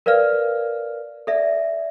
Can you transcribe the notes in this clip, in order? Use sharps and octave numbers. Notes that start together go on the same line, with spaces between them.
A#4 B4 D5 F5 F6
A4 D5 E5 A#6